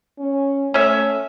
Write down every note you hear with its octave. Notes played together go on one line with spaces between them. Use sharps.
C#4
A3 C#4 E5